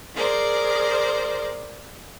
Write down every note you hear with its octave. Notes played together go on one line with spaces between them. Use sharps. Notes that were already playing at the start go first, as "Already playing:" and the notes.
G#4 A#4 C5 D5